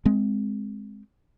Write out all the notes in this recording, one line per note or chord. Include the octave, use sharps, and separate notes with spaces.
G#3 C4